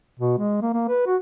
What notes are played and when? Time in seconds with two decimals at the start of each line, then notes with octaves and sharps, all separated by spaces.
0.20 B2
0.38 G#3
0.62 A#3
0.73 A#3
0.88 B4
1.06 F#4